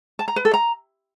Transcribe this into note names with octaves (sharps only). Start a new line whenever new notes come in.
A5
A#5
B4
A4
A#5